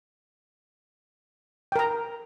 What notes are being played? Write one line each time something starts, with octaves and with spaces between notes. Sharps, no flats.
A#4 G5 A#5